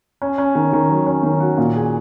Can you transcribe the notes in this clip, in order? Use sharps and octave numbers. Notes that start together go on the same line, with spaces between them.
C#4
C#4
D#3
D#3
F#3
C#4
D#3
F#4
A#2
G#4